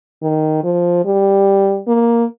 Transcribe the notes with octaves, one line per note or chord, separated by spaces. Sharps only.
D#3
F3
G3
A#3